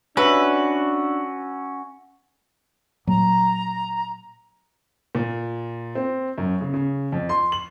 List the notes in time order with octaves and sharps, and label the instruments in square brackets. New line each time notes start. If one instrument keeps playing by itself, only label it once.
[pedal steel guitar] C#4 F#4 E5 [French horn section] D4 [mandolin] B4
[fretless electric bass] A#2 F#3 A#3 [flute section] A#5
[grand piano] A#2
C4
F#2
C#3
C#3
F2
C6
F#7